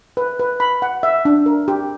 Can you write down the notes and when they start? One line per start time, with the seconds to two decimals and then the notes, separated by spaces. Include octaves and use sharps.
0.17 B4
0.39 B4
0.60 B5
0.82 F#5
1.03 E5
1.25 D4
1.46 A#4
1.68 G4